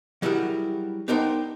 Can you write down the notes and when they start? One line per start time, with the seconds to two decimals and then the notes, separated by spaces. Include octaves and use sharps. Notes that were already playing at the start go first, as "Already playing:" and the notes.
0.22 F#3 G3 E4 F#4 G#4 A#4
1.08 B3 D4 D#4 A#4 C5 G5